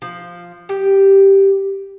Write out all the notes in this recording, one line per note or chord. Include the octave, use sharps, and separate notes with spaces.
F3
G4